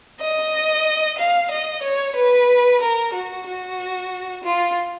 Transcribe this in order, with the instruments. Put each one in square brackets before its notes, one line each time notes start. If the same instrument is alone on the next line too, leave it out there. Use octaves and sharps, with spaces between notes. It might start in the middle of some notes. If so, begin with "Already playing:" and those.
[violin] D#5
F5
D#5
C#5
B4
A#4
F#4
F#4
F4